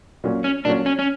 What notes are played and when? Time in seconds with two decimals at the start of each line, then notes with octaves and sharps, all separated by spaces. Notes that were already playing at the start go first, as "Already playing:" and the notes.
0.24 A#2 F#3 C#4
0.44 C#4
0.65 A#2 F#3 C#4 D4
0.86 C#4
0.99 C#4